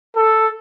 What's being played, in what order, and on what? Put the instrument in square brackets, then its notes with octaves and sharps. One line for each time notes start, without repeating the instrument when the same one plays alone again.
[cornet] A4